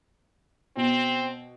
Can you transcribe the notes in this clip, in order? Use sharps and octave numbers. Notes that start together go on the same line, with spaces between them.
B2 C4